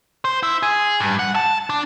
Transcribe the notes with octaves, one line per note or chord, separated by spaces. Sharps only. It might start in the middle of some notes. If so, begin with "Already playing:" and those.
C5
E4
G#4
G2
F#5
A5
D4